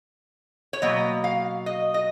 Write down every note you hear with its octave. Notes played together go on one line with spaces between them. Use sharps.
C#5
B2 F#3 A#3 D#5
F5
D#5
D#5